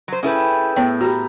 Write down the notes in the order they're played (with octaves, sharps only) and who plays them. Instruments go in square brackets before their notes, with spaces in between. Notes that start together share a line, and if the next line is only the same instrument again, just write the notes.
[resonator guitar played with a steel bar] F#3 C5
[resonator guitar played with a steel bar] C#4 E4 B4 [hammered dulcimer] G#4 A4 G5
[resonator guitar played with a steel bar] A2 [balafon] B3 C#5 G5
[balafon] F#4 G4 [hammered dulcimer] A#5 B5